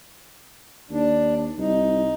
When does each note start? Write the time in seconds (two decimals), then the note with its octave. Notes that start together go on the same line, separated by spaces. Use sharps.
0.91 D#2 D4
1.58 C2 D#4